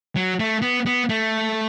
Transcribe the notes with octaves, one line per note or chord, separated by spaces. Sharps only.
F#3
A3
B3
B3
A3